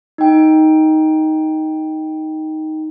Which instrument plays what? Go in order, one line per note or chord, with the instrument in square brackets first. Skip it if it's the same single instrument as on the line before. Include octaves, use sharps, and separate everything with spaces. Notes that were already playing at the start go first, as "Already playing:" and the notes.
[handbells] D#4 G5